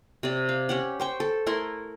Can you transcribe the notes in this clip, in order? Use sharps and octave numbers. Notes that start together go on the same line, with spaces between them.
C3 D5
F5
C#4 G4 F#5
C5 G5 C#6
A4
A3 E4 A#4 C6